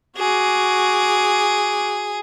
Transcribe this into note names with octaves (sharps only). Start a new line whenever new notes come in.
F#4 G#4 D6